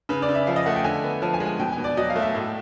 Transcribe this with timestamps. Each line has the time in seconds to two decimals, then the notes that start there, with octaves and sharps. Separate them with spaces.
0.09 C#3 B4
0.22 D5
0.29 C#3
0.35 E5
0.47 F3 F5
0.56 D#5
0.66 A3 F#5
0.76 G5
0.84 D3 G#5
1.04 B3
1.22 F3 A5
1.34 G#5
1.40 G#3
1.46 G#5
1.59 B2 G5
1.72 G#5
1.78 B2
1.84 D5
1.97 F#3 D#5
2.10 F5
2.16 A3
2.22 E5
2.35 A2